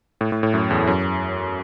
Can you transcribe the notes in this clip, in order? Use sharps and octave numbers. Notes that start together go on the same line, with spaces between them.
A2
A2
A2
F#2
E2
F#2